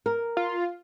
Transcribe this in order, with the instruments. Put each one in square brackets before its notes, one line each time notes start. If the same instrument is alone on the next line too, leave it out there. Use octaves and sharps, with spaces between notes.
[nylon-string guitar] A#4
[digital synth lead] F4